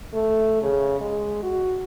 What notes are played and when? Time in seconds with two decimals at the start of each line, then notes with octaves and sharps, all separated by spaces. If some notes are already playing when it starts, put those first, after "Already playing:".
0.13 A3
0.63 C#3
1.01 G#3
1.43 F#4